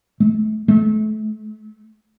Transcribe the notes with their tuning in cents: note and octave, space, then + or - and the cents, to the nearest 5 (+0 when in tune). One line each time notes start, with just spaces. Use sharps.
A3 -30
A3 -35